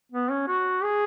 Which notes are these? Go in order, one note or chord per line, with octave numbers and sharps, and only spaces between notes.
B3
C#4
F#4
G#4